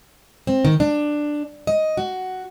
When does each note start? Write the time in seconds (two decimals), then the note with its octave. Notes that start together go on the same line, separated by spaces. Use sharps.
0.47 C4
0.65 D#3
0.80 D4
1.67 D#5
1.97 F#4